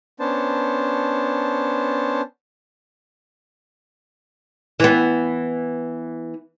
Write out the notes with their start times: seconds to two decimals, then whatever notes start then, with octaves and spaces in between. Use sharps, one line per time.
0.20 B3 C#4 D4 C5 A5
4.80 E3 B3